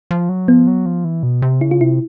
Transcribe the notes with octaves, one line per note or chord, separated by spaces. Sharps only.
F3
F#3
F3 B3
F#3
F3
E3
B2
C3
C#3 E4
F4
C3 E4